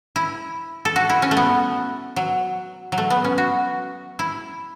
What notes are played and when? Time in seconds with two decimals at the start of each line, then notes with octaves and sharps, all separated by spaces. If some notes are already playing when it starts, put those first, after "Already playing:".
0.16 E4
0.85 A4
0.96 F#4
1.10 E4
1.22 C#4
1.31 A3
1.37 B3
2.16 F#3
2.92 F#3
2.98 A3
3.10 B3
3.24 C#4
3.38 F#4
4.19 E4